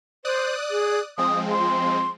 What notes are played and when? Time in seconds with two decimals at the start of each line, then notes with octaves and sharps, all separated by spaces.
0.25 C5 D5 D#6 F#6
0.70 G#4
1.18 F3 G#3 C4 D#6
1.51 C6